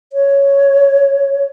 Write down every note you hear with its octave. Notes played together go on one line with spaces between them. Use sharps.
C#5